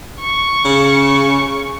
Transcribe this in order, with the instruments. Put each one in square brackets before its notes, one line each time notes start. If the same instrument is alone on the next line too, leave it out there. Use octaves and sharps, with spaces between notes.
[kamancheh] C#6
[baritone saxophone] C#3